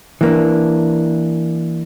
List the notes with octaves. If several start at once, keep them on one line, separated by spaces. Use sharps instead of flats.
E3 A#3 D4